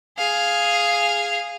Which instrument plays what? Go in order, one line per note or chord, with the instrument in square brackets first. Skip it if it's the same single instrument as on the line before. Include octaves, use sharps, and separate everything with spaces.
[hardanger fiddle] G#4 F5